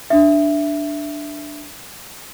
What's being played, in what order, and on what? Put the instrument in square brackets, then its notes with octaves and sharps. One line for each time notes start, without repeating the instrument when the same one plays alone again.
[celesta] D4 E5